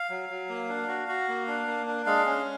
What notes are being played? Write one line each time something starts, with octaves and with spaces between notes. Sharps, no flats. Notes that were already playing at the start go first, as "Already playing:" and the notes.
Already playing: F5
F#3
F#3
A#3
D4
F#4
F#4
A#3
D4
A#3
D4
G#3 F5
C#4